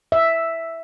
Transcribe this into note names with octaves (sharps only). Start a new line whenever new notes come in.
E5